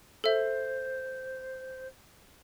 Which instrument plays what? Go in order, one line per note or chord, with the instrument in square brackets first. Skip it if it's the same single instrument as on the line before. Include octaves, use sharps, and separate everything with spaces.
[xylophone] A4 E5 [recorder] C5